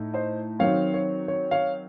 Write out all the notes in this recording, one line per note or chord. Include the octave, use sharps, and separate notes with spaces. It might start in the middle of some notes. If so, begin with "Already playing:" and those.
Already playing: A2 A3 D#4
C5 D#5
D#3 F#3 C4 C#5 F5
C#5
C#5
C#5 F5